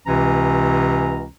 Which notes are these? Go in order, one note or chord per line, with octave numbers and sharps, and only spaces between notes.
C#2 C3 E3 C#4 A#5